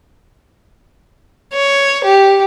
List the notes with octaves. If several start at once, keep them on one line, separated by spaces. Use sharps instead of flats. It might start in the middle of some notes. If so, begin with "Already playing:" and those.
C#5
G4